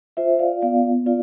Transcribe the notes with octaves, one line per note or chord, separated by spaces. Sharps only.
F4 C5 E5
D5 F5
B3 D5 F5
F4 D5 F5